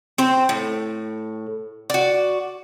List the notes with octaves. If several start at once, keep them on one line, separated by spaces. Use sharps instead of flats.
C4 C5
A2
F#4 D5